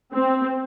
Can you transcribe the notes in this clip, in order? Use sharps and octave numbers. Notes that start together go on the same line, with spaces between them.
C4